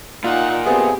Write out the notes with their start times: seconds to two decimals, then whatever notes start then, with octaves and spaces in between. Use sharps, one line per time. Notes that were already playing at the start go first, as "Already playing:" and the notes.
0.24 A#2 D#4 F4 F#5
0.65 A3 B3 C4 G4 G#4